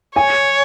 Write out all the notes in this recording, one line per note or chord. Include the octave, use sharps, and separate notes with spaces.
C#5 G#5